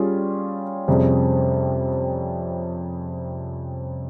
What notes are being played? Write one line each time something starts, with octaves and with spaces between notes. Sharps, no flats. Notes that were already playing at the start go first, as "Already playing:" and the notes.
Already playing: G3 C#4 F4 G#4
F2 C3 G3 C#4 G#4